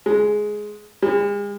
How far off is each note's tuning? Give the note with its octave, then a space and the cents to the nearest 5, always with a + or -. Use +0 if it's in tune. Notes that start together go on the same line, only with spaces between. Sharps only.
G#3 +10
G#3 -40